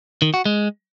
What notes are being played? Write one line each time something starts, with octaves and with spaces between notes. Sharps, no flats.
D#3
F#4
G#3